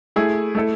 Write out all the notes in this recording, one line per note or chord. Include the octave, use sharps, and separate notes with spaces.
A3 E4 G#4
A3 E4 A4